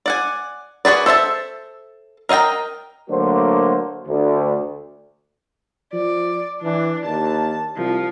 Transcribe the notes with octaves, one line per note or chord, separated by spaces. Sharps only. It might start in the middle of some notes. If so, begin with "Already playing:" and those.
D5 F#5 G#5
F#4 G#4 B4 D5
A4 C5 E5 A5
A#4 D#5 F5 G5 A#5
D3 F#3 A3 A#3 F#4 C5
D2
F3 D5
E3 D4
D#2 A5
C2 F3